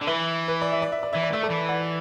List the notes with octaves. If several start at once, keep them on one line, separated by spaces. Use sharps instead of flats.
D3
E3 B4 E5
B4
D5
E5
D5
E5
D5
E3 E5
D5
A3 E5
A4 D5
E3
D5 F#5